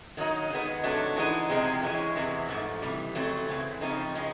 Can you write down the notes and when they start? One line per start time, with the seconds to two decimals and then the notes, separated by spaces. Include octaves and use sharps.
0.17 D#3 F#3 A#3 D#4
0.50 D#3 G#3 B3
0.84 C3 D#3 F#3 A3 D4
1.16 E3 G#3 B3 D#4
1.50 C3 F3 G#3 C4
1.83 E3 G#3 C#4
2.15 E2 C3 E3
2.48 G#2 F3 A3
2.82 C3 E3 G3
3.15 F2 C#3 F#3 A3 C4
3.48 C#3 E3 G#3 C4
3.81 C#3 F3 A3 C4 D#4
4.14 C#3 F3 G#3 B3